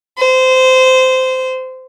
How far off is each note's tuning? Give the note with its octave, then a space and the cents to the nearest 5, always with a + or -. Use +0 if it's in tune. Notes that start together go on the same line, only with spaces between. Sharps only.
C5 -20